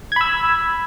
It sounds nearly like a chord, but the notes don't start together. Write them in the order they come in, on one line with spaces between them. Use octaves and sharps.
G#6 B5 E6